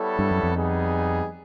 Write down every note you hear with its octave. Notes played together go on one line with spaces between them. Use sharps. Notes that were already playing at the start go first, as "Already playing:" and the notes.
Already playing: G3 B3 E4 A4 C#5
G2
F#2
F2
G3 B3 D#4 G#4